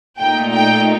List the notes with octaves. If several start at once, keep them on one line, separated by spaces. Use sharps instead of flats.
A#2 A3 D#4 G5
G5